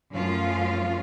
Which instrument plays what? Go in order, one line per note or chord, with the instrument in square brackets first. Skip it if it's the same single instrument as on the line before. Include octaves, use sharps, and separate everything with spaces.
[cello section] F#2 F3 A3 C#4 F4 F5